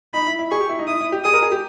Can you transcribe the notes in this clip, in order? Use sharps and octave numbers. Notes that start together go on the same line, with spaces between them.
D#4 B5
E4
E4
G#4 C#6
G4
E4
D#4
E4 D#6
E4
G4
G#4 D#6
A#4
G#4
G4